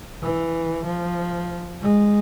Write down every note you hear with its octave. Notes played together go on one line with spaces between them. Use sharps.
E3
F3
G#3